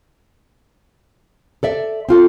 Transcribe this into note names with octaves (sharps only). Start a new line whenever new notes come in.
A4 D5 E5
C4 F4 A4